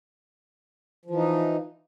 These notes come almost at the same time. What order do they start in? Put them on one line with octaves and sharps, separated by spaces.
F3 E3 D#4